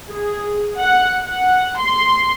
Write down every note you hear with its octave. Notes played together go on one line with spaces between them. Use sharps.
G#4
F#5
F#5
C6